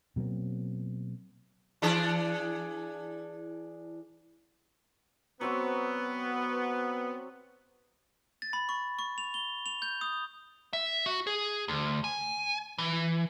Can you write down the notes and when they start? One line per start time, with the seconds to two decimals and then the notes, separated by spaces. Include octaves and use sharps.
0.16 B2 F#3 A#3 C4
1.82 E3 D4 G#4
5.41 F#3 B3 C4 F#4
8.42 A6
8.53 B5
8.69 C#6
8.99 C#6
9.18 F7
9.34 G7
9.66 F7
9.82 G6
10.01 D#6
10.73 E5
11.06 F#4
11.27 G#4
11.68 D2
12.04 G#5
12.78 E3